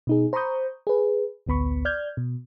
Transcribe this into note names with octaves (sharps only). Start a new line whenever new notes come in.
B2 D#4 G#4
C5 A#5 B5 C#6 D#6 G6
G#4 B4
A1 D2 B3 B5 C#6
D5 F6 G6 G#6
B2